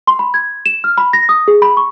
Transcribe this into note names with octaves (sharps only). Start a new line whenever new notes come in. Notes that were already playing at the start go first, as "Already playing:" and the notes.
C6
B5
G#6
E7
F6
B5
A#6
D#6
G#4
B5
C#6